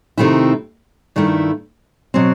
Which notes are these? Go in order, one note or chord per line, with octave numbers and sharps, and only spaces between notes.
C3 D#3 A3 C4 E4
G2 D#3 A3 E4
B2 F#3 C4